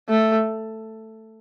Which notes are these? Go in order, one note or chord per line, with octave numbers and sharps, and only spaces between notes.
A3